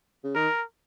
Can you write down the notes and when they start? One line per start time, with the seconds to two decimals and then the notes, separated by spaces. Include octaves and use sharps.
0.24 C#3
0.35 D#3 A#4